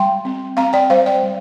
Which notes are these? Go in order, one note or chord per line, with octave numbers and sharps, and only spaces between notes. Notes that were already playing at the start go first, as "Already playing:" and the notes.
Already playing: G3 G5 C6
C4
C4 F5 A#5
D5 G5
G3 C5 F5
D5 G5
G3